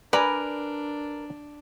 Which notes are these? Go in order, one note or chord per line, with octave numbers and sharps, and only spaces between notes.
D4 A#4 B4 D5 G#5 B5